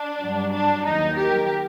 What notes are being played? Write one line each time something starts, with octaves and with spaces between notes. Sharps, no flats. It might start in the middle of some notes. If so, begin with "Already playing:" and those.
Already playing: D4
G2 F#3
D4
D#2 D#3 F#3 D#4
G4 A#4